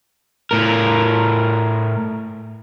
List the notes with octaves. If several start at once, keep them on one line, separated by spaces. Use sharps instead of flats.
A2 A#4